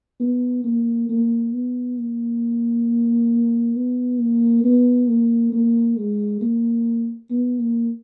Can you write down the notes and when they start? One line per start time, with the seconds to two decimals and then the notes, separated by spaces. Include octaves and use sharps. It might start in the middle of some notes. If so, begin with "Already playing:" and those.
0.20 B3
0.64 A#3
1.09 A#3
1.53 B3
1.98 A#3
3.75 B3
4.20 A#3
4.64 B3
5.08 A#3
5.52 A#3
5.97 G#3
6.41 A#3
7.30 B3
7.59 A#3